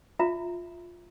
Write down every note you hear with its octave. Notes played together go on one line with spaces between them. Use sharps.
F4 E5 A#5